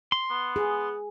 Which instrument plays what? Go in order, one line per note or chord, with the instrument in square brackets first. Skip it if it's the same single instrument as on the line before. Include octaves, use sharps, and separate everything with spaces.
[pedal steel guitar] C6
[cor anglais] B3
[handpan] G#4